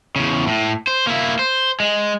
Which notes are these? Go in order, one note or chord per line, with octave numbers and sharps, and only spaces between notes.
E2 C#3
A2
C5
A#3 E4
C5
G#3